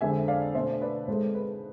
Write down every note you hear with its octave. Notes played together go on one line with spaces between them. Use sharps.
F2 D3 G#3 C4 E5 G#5
D5 F5
B2 A3 D4 C5 E5
B4 D5
G#2 G#3 C4 A4 C5
B4